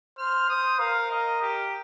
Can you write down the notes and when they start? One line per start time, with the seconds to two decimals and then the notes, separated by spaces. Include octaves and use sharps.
0.18 C5 F6
0.49 C5 D#6
0.79 A#4 F5
1.11 D#5
1.41 G4